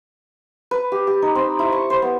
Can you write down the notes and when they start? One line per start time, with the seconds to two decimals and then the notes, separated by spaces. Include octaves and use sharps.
0.71 B4
0.92 G4
1.07 G4
1.22 D#4
1.35 C4
1.59 E4
1.72 C#6
1.90 C5
2.02 B3